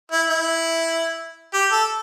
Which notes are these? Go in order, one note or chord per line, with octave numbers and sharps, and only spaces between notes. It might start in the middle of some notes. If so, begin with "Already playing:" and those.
E4
E4
G4
A4